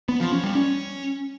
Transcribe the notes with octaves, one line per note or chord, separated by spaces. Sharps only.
B3
F3
C#4
G3
C#4